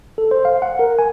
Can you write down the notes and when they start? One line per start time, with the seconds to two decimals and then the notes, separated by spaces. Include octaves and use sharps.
0.18 A4
0.31 C5
0.45 F5
0.62 F#5
0.79 A#4
0.99 G#5